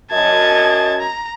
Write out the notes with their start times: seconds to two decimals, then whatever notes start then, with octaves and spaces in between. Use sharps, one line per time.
0.11 F#2 D#5 A5 G#6
1.00 A#5